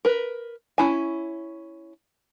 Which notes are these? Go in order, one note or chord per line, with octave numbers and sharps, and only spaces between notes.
A#4 B4
C#4 E4 G#5